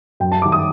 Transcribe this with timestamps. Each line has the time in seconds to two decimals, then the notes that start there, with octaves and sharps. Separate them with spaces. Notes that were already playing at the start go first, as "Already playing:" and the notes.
0.20 F#2 G5
0.32 A5
0.42 G3 D6
0.45 D#3
0.52 D#6